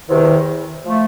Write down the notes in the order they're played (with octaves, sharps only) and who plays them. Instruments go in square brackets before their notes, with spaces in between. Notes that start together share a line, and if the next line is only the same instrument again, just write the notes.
[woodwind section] E2 C3 D#3
F3 A3